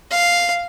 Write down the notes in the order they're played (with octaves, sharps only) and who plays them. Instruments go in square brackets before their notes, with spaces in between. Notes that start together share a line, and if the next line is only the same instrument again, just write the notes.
[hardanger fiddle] F5